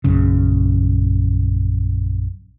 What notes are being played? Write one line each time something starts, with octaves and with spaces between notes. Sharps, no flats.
A#1 F#2 C#3